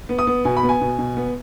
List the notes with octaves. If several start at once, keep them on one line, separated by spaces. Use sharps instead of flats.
B3
D#6
B3
B2 G#5
B5
B3
G#5
B2
B2
B3